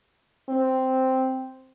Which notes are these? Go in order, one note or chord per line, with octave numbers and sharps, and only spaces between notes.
C4